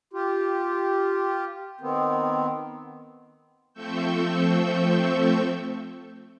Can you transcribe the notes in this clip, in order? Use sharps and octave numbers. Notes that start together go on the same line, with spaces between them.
F4 G4
D#3 B3 C4
F3 A3 C4 C#6 E6 G6